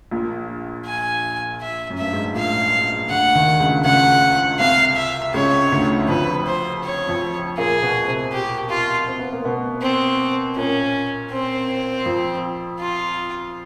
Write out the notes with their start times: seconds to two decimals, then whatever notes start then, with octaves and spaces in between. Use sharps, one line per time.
0.11 A#1 A#2
0.86 G#5
1.62 E5
1.90 F#2
1.98 G2 E5
2.13 G#2
2.24 A2
2.35 A#1 A#2 F5
3.10 D2 D3 F#5
3.35 D#2 D#3
3.60 C#2 C#3
3.85 C#2 C#3 F#5
4.59 C2 C3 F5
4.96 E5
5.34 C#2 C#3 C#5
5.72 D2 D3
6.08 F2 F3 B4
6.47 C5
6.84 C#5
7.08 F2 F3
7.58 A#2 A#3 G#4
7.83 B2 B3
8.07 C3 C4
8.32 G4
8.69 F4
9.08 C4
9.19 B3
9.33 A#3
9.45 B2 B3
9.82 C4
10.56 A#2 A#3 C#4
11.32 C4
12.05 F2 F3
12.80 F4